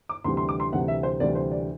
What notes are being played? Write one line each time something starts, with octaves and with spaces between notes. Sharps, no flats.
D6
D2 C3 E3 G3 C6
C6
D6
C6
D2 C3 E3 G3 F#5
E5
C5
D2 C3 E3 G3 D5
C5
D5